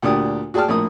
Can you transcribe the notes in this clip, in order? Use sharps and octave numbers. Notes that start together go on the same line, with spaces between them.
D2 A#2 D4 G4 D#6
F#4 G#4 D5 G5 A5 F6
A#1 A2 A#3 D#6